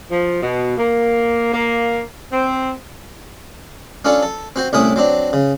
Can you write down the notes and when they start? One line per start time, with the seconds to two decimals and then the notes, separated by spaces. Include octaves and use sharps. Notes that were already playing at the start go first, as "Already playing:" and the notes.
0.11 F3
0.43 B2
0.78 A#3
1.54 A#3
2.32 C4
4.05 C#4 D4 F4 A4 C#5
4.23 A4
4.56 C4 F#4 C5
4.73 C2 A2 C#4 E4 E5 D#6
4.96 F#3 C4 D4
5.33 C#3